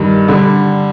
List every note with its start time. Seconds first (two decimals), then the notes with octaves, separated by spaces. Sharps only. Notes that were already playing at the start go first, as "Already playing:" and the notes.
Already playing: G2 D#3 G3
0.28 D3 G3 D4